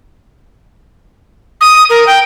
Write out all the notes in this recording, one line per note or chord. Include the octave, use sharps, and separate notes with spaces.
D#6
A#4
G5